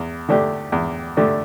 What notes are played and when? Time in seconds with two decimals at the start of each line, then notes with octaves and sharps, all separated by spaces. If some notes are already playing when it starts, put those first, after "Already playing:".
Already playing: E2
0.29 D3 A3 D4 G4
0.72 E2
1.17 D3 A3 D4 G4